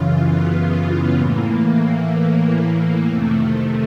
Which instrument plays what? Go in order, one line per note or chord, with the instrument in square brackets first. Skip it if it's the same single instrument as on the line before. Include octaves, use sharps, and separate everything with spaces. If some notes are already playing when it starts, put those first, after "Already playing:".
Already playing: [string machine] F#2 C#3 E3 F4
B3
A2 E3 A#3
F2 C3 D#3 A3